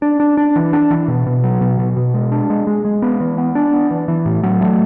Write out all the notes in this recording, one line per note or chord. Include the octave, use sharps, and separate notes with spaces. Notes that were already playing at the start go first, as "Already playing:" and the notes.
D4
D4
D4
E3
D4
E3
B2
B2
F#3
B2
B2
B2
G#3
D4
G#3
G#3
G#3
B3
E3
B3
D4
B3
E3
E3
A2
F#3
A3